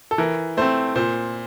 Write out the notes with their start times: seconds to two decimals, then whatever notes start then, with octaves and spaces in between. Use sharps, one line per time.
0.11 A4
0.18 E3 A#4
0.57 A3 C4 C5
0.96 A#2 C5